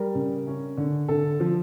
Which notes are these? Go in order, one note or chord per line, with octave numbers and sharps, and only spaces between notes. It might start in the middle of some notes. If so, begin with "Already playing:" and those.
Already playing: G3 A#4
C#3
C#4
D3
D3 A4
F3